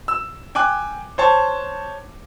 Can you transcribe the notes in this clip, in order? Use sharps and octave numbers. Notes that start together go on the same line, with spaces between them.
E6
G5 G#5 D6 F#6
C5 C#5 A5 C#6